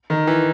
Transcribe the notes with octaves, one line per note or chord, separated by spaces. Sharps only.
D#3
E3